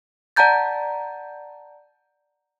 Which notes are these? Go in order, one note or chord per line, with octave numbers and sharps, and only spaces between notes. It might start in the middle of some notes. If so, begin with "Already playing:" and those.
D5 F#5 A5 A#5 G6 A6